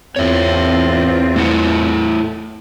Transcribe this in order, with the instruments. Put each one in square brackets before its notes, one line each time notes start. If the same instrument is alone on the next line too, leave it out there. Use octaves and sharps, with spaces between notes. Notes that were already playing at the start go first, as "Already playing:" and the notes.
[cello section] E2 C4 F4 [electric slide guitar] C#5 E5
[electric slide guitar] A3 E4 F#5